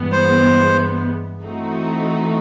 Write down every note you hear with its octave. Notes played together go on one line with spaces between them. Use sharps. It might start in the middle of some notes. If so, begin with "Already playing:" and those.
Already playing: G2 E3 G#3 B3
C5
E3 A3 C4 D#4 F#4